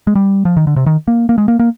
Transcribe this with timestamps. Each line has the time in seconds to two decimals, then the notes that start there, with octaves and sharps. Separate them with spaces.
0.07 G#3
0.15 G3
0.45 F3
0.57 D#3
0.67 D3
0.76 C3
0.86 D#3
1.08 A#3
1.29 A#3
1.38 G#3
1.48 A#3
1.59 A#3